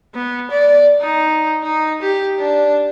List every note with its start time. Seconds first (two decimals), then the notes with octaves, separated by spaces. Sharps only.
0.14 B3
0.51 D5
1.01 D#4
1.63 D#4
2.02 G4
2.39 D4